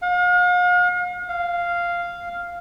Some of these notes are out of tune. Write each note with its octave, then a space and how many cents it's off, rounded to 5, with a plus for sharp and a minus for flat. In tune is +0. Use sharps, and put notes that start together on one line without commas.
F5 +45
F5 -5